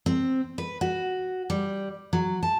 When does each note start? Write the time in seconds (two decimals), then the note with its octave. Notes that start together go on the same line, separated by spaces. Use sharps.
0.06 C4
0.58 B4
0.81 F#4
1.50 G3
2.13 F#3
2.43 A5